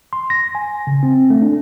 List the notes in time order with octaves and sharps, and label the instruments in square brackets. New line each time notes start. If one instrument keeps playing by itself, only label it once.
[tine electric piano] C6
A#6
G#5
C#3
C4
A3
D4